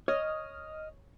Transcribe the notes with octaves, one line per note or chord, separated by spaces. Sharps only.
C#5 D#5 D#6 F6